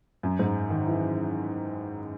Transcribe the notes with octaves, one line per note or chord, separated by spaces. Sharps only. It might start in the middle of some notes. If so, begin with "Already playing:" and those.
F#2
G#2
D#3
E3